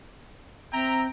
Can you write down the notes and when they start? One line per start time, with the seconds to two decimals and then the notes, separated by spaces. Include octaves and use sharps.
0.73 C4 E5 G5 A#5